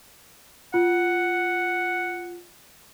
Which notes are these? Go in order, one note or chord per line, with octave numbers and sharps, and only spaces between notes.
F4 F#5